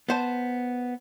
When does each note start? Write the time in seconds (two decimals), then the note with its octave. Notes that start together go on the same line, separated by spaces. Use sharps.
0.09 B3 C5 A5